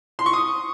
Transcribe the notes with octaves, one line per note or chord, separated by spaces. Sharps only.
C6
C#6
D#6